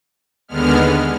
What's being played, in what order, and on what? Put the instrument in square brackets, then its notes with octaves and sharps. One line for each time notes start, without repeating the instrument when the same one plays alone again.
[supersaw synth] D#2 D3 G#3 B3 F6